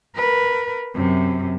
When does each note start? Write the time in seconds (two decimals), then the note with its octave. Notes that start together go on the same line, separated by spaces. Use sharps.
0.15 A#4 B4
0.94 F#2 C3